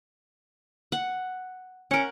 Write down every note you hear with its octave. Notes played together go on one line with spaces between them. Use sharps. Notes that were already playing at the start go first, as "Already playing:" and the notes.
F#5
C#4 A#4 F#5